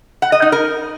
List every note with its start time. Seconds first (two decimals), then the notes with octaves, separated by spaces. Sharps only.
0.22 F#5
0.32 D#5
0.42 D#4
0.52 A#4